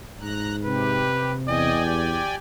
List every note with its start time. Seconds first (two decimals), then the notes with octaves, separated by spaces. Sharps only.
0.20 G#2 A#5 F#6
0.64 C3 G4 B4
1.48 E2 D5 D#5 G5 G#5
1.86 G4